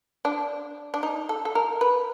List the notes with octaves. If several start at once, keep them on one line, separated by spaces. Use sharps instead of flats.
D4
D4
D#4
A4
A4
A#4
B4